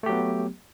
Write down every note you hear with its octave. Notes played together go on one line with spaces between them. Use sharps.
F#3 A3 B3 G4